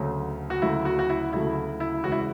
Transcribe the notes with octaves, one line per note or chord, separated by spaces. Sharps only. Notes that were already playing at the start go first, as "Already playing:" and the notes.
Already playing: D2 C#3 F#3 A3
F#4
D2 C#3 F#3 A3 E4
F#4
F#4
E4
D2 C#3 F#3 A3 E4
E4
E2 C#3 G#3 F#4
E4